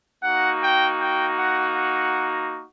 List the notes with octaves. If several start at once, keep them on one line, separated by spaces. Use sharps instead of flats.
A#3 D#4 F#4 F#5
G5
G5
F#5
F#5